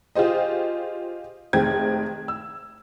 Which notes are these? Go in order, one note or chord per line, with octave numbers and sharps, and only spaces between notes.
F4 G4 G#4 C5 D#5
F1 D#3 G#3 C4 G#6
E6